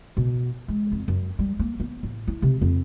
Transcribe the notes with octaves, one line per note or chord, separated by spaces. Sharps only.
B2
G#3
F2
F#2
G3
A#3
B3
A1
E4
C3
F2